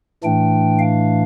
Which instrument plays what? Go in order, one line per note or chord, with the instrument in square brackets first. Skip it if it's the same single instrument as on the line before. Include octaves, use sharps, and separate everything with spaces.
[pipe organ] A2 E3 A3 D4 G5
F5